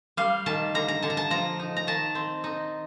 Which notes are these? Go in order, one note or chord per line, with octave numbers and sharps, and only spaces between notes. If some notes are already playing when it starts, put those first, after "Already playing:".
G3 F5
D#3 A5
D3 A#5
A#5
D3 A5
A#5
A5
F3 A#5
D#4
A#5
D#3 A5
C4
D#4